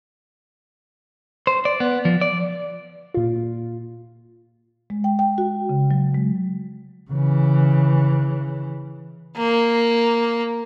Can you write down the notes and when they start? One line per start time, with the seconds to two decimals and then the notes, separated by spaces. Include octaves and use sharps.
1.47 C5
1.65 D5
1.80 B3
2.05 F3
2.21 D5
3.14 A#2 F4
4.90 G#3
5.04 G5
5.19 G5
5.38 F#4
5.69 C#3
5.91 F#3
6.14 G#3
7.11 C#3 E3
9.37 A#3